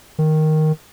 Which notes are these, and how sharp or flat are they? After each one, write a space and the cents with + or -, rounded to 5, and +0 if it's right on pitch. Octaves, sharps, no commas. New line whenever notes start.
D#3 +0